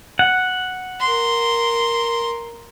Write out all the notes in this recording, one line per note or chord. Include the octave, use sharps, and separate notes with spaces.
F#5
A#4 C6